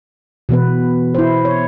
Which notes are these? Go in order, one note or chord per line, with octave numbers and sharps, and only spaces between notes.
B2 E3 B3 B4
E4 C5
C#5